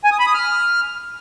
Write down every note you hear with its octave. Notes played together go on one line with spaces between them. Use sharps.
G#5
D#6
B5
D#6
F6